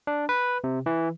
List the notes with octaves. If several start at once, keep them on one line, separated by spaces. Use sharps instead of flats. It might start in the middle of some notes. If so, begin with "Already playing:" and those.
D4
B4
C3
E3